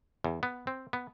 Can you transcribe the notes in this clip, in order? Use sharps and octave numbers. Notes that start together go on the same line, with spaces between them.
E2
B3
C4
B3